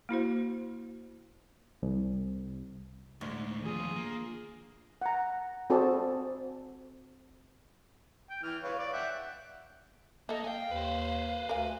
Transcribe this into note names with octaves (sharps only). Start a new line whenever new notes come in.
A#3 E4 F#4 C5
C2
D2 A2 G#3
D#2 F3 F4 G#4
A#3
F#5 A#5
C4 F#4 G#4 A4 D5 A5
G5
E3 F6
B4 C#5 F5
D5 F5
E5 F#5 G5
A#3 A4 D#5 E5
F5 G5 G#5
D#2 B4 C5
D2 A#4 F5 G#5